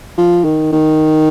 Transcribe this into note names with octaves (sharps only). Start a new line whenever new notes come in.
F3
D#3
D#3